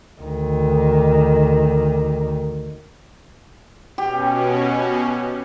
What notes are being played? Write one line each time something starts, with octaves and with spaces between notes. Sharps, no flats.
D2 D#3
B2 C#4 G4